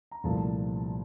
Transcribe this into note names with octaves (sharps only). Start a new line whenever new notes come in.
A#5
C2 A#2 F3 A3 A5